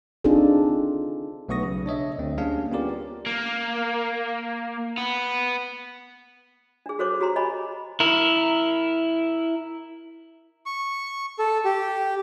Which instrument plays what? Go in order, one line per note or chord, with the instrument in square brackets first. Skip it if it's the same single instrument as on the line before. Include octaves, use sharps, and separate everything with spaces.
[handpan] C4 D4 D#4 F4 G#4 A4
[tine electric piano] B1 A3 B3 C#6 D#6 A#6
B1 C#3
D4 C#5 D#5 E5
D2 C4
G3 A#3 C#4 D4 G#4 F5
B3 C#4 F4 G4 A#4 D5
[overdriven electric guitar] A#3
B3
[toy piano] D4 G#4
F#4 A4 C5 C#5 D6
F#4 G4 A#5 C6
C#5 D#5 G#5 B5
[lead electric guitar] E4 A#4
[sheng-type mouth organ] C#6
A4
G4